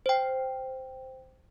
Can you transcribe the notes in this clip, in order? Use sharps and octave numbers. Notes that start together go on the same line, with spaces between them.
C5 G5